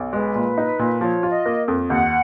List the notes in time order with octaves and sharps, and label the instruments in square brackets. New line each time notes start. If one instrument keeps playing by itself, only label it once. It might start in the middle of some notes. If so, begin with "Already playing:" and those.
Already playing: [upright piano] B1
[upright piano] G#3 [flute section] B4
[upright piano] A#2
D#4
A#2
[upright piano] F3 [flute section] C#5
[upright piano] F4
[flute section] D#5
[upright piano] A#3
F2
[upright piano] D#2 [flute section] F#5